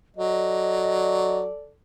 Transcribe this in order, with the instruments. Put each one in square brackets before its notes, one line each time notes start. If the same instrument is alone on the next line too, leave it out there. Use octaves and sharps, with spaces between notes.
[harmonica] F#3 [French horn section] A4 D5 [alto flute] D#5